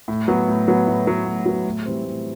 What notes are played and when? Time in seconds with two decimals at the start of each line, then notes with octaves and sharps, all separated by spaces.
0.08 A2
0.28 F#3 B3
0.48 A2
0.68 F#3 B3
0.87 A2
1.07 F#3 B3
1.26 A2
1.46 F#3 B3
1.65 A2
1.85 E3 G3 C4
2.04 A2